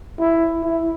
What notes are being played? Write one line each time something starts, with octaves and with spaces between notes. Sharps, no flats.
E4
E4